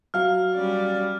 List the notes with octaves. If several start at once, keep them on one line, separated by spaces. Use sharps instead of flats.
F#3 F5 F6
G3 C#4 D5